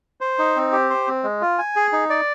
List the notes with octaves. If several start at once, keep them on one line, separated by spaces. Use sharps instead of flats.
C5
D#4
C4
G4
C5
C4
G#3
F4
G#5
G#4
D#4
D5